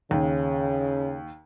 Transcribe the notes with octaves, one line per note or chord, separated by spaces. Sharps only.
D#2 C#3